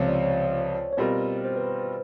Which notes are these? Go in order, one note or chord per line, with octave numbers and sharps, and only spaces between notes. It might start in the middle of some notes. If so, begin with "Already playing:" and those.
Already playing: C#2 C3 F3 C5 C#5
D5
C#5
C#5
B2 G3 C4 F4 A#4 C5
C5
B4